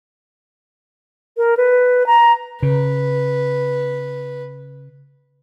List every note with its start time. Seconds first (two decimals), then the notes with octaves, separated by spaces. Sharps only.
1.37 A#4
1.57 B4
2.07 A#5
2.63 C#3 B4